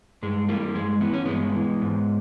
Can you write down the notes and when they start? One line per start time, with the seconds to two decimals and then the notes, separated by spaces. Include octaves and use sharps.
0.23 G2 G#3
0.48 E3 G3 A#3
0.75 G2 G#3
1.01 E3 B3
1.14 C#4
1.26 G2 G#3 B3
1.55 E3
1.82 G#2